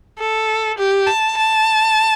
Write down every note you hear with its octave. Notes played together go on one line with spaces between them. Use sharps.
A4
G4
A5
A5